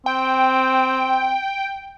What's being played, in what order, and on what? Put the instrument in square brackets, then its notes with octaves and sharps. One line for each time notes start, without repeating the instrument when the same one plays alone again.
[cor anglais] C4 [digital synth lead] G5